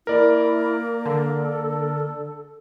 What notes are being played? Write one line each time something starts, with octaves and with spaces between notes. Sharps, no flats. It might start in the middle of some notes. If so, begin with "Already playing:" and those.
A#3 E4 A#4 D5
D3 A4